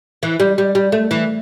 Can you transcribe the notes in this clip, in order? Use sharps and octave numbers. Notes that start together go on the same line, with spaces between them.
E3
G3
G3
G3
A3
E3